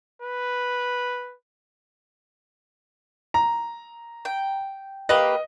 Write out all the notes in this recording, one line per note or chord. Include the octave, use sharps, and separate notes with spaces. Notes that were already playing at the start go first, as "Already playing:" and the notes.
B4
A#5
G5
A#3 G4 B4 D#5